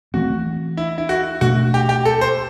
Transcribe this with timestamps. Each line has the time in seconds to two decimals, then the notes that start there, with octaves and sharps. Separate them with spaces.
0.14 E3 A3 C4 F#4
0.77 E4
0.98 E4
1.09 F#4
1.41 B2 A3 D4 F#4
1.74 G4
1.89 G4
2.05 A4
2.21 C5